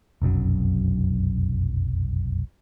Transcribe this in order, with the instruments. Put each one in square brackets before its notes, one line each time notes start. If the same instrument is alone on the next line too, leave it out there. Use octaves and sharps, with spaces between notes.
[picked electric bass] F1 B1 F#2 F#3